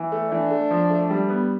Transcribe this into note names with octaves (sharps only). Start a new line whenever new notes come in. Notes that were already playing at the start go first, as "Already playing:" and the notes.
Already playing: E3
A3
E3 D4
A3
F3
A3
G3
B3